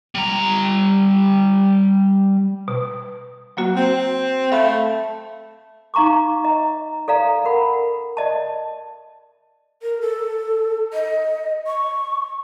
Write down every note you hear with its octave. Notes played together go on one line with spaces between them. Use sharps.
G3 A#5
B2
F#3 A#3 F#4
C4
A3 E5 F5 B5
D#4 F5 A#5 C#6 D6
D#5 A#5
A4 D5 F5 A#5
A#4 F#5 B5
D5 D#5 A5
A#4
A4
D#5
C#6